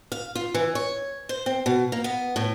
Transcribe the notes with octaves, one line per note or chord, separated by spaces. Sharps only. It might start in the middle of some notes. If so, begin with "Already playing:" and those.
F5
F4
E3
C#5
C5
C4
B2
A#3
B3
A2